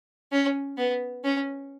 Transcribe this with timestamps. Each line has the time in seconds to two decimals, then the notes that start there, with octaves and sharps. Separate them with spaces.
0.32 C#4
0.78 B3
1.24 C#4